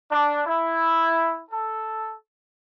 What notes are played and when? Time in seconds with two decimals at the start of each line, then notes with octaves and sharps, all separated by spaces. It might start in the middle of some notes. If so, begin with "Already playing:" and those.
0.10 D4
0.46 E4
1.51 A4